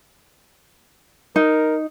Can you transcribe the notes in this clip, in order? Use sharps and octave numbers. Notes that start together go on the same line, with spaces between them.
D#4 A#4